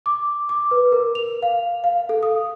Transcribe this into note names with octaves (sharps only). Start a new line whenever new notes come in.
D6
D6
B4
A#4
F7
F5
F5
A4
D#6